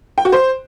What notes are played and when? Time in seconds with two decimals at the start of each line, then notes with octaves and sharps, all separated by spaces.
0.18 G5
0.25 F#4
0.32 C5